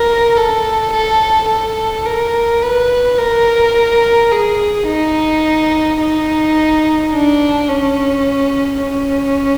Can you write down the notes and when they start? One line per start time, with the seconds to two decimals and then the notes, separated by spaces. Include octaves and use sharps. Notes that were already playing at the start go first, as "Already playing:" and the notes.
Already playing: A#4
0.37 A4
0.93 A4
1.48 A4
2.05 A#4
2.62 B4
3.17 A#4
4.31 G#4
4.87 D#4
6.00 D#4
7.13 D4
7.69 C#4
8.82 C#4